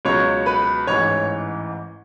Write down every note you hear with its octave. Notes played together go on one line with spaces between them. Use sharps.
C#2 B2 F#3 B3 C#5 C#6
B4 B5
A1 G#2 E3 C#5 C#6